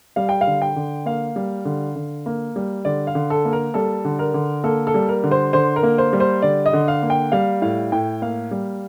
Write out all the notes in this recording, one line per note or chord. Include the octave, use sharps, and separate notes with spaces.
G3 F5
G5
F5
D3
G5
D3
A#3 F5
G3
D3
D3
A#3
G3
D3 D5
F5
D3
A4
A#3
A#4
G3 A4
D3
A#4
D3
A#3 A4
A4
G3
A#4
D3
C5
D3 C5
A#4
A#3
C5
G3
C5
D3 D5
D#5
D3
F5
A#3
G5
G3 F5
A2 F5
A2 G5
A#3 F5
G3